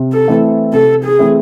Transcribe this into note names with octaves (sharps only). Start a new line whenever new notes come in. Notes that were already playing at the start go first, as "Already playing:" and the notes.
Already playing: C3
A4
E3 A3 C4 E4
C3 A4
G#4
E3 A3 C4 E4